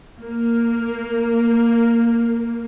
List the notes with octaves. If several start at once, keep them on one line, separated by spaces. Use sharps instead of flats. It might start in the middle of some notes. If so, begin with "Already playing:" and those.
A#3